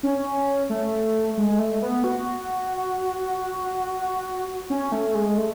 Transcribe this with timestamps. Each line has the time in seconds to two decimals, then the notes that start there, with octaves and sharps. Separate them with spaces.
0.03 C#4
0.69 A3
1.37 G#3
1.59 A3
1.82 B3
2.04 F#4
4.70 C#4
4.92 A3
5.15 G#3
5.38 A3